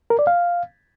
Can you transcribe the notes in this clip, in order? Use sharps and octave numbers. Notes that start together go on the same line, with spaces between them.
A#4
D5
F5